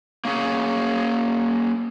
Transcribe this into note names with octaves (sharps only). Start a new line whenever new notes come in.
A#3 C#4 G#4